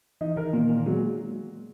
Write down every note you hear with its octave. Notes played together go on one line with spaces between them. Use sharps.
E3 D#4
D#3 A#4
A#2 A#3
A#2 A#3
F#3 G#3